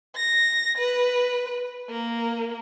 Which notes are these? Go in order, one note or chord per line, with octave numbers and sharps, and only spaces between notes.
A#6
B4
A#3